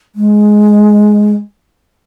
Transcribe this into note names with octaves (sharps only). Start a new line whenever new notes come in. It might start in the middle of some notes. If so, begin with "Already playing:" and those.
G#3